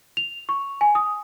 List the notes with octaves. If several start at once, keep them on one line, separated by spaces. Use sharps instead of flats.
F7
C#6
G#5
D#6